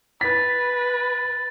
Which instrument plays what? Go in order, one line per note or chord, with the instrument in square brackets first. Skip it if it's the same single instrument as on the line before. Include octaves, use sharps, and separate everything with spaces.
[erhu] B4 [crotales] A6 [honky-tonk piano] B6